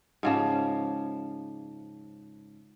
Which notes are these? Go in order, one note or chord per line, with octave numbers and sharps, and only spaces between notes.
G#2 C#3 F3